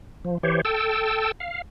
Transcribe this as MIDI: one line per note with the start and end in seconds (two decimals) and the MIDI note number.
0.25 0.38 53
0.43 0.61 52
0.43 0.61 67
0.43 0.61 72
0.43 0.61 73
0.65 1.32 69
0.65 1.32 79
0.65 1.32 81
0.65 1.32 88
1.40 1.62 77